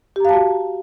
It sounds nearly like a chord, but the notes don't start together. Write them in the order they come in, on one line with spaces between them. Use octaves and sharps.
G4 A#5 F5 A5 F#4